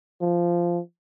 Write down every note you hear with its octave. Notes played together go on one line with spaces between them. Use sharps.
F3